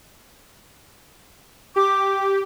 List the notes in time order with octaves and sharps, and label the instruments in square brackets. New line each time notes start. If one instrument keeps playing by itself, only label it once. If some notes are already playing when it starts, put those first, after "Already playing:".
[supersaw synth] G4 [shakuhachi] D6